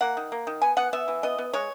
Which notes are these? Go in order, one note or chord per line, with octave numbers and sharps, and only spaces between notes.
A#3 F#5
D#3
A#3
D#3
B3 G#5
B3 F#5
B3 E5
E3
B3 D#5
B3
G#3 C#5